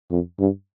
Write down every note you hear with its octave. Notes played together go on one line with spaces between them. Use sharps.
F2
G2